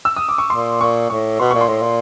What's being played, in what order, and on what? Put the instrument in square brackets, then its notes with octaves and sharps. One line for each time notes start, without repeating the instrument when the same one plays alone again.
[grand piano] E6
D#6
D6
C#6
[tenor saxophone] A#2 [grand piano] C6
[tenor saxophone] A#2 [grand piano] C#6
[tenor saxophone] A2 [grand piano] C#6
[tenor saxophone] B2 [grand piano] C6
[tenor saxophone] A#2 [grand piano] C#6
[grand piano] C6
[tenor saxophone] A2
A#2